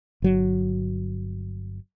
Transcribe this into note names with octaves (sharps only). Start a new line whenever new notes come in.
G1 F#3